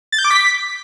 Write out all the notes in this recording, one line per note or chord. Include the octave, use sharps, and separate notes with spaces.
A6
G6
D6
B6